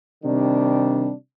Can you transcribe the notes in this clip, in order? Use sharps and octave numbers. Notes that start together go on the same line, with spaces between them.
C3 D#3 G3 D4